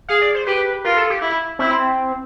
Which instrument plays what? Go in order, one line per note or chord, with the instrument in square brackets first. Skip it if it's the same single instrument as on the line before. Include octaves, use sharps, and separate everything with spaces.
[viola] G#4 [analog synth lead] F5
[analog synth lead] D5
C5
[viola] G4 [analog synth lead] B4
[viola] F4 [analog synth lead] A#4
[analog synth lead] A4
G4
[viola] E4
[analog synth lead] C4 [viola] E4